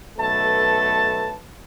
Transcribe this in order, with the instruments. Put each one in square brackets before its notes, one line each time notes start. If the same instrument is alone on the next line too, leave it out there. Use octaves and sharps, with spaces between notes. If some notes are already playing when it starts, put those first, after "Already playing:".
[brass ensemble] B1 A3 A4 B4 A5